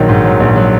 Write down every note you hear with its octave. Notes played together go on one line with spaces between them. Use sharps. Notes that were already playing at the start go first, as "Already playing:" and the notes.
Already playing: A#1 D#3 F#3
G#2
F#3
A#1
F#3